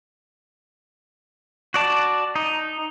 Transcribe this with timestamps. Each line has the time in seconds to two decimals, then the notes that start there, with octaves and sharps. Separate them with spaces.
1.74 F#4 D5 A5
2.36 D#4